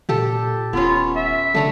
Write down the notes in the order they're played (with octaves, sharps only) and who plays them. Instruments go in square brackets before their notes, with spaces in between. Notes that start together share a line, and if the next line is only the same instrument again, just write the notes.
[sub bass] A#2 [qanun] G4 A4
[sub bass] D#1 [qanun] B3 C#4 [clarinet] F4
[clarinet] E5
[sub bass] C#3 [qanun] A3 D4 A#5